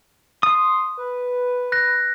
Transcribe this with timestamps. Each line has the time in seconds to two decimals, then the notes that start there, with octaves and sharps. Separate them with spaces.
0.43 C6 D#6
0.98 B4
1.72 F#6 A#6